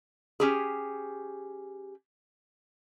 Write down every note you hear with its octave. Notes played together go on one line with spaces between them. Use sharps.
C#4 G4 G#4